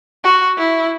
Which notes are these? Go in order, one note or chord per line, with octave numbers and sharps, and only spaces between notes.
F#4
E4